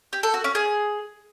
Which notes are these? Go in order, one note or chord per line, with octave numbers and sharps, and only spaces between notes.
G4
A4
F#4
C#4
G#4